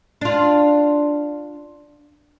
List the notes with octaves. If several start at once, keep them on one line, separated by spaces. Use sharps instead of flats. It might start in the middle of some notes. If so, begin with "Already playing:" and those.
D4 F4